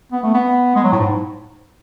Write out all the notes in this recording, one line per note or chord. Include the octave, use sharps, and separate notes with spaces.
B3
A3
B3
G#3
F#3
A2
G#2